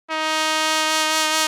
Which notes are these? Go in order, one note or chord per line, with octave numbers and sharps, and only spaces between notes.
D#4